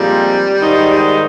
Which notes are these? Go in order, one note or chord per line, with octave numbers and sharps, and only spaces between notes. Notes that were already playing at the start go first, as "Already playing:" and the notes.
Already playing: A#2 F3 G3 G#3 C4 D#4
G#2 D#3 G#3 D#4